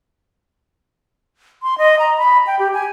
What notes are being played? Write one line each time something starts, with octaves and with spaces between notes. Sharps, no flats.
C6
D#5
A#5
B5
G5
G4
G#5